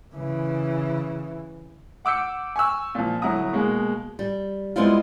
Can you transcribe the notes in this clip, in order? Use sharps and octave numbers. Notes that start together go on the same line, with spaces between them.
C#3 E3
F#5 D6 E6 G6 C#7
G#5 C#6 E6
A#2 F3
G1 F#3 E4 F#5 A#5 D#6
B2 G#3 A#3
G3
G3 G#3 B3 C4 E4 F4